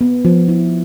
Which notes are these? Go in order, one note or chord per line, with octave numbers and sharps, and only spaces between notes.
B3
F3
E4